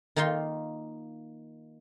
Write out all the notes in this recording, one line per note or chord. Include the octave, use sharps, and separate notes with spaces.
D#3 A#3 D#4 F4 C6